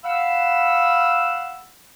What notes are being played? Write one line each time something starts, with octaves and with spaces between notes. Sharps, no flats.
F5 F#5 B5 E6